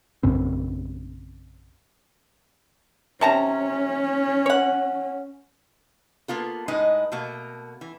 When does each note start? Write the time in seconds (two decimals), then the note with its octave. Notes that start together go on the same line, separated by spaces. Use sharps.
0.23 A#1 F#2 C#3 C4
3.21 C3 C#4 A5 A#5
4.46 C#5 F#5
6.28 A#3 B3 F4 A4
6.68 A2 G#3 D#4 B4 D#5
7.12 B2 A3 A#3
7.81 E3